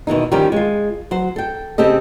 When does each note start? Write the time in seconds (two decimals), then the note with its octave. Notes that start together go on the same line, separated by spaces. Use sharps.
0.07 B2 D#3 E3 D#4
0.32 D#3 F3 G3 C#4 G4 A#4
0.52 G#3 F4
1.11 F#3 C5
1.36 A4 G5
1.78 C#3 C4 G4 A4 D#5